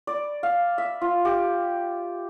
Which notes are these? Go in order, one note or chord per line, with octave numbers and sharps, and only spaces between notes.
D5
F5
E5
F4
G4